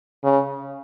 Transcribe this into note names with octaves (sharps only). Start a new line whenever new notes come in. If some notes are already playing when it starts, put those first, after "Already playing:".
C#3